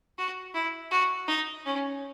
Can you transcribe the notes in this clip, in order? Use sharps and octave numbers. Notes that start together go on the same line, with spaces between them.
F#4
E4
F#4
D#4
C#4